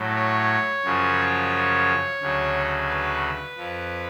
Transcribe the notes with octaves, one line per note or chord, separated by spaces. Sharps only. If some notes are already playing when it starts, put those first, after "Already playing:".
Already playing: A2 F#3
C#5
F#2 C#3 F3
D2 C#3 F#3
B4
F2 F3